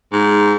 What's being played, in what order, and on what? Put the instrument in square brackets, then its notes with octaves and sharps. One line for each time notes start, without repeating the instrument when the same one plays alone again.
[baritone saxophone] G#2